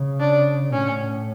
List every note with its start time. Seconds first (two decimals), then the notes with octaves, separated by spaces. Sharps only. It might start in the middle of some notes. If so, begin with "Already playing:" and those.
Already playing: C#3
0.20 D4
0.73 A2 C#4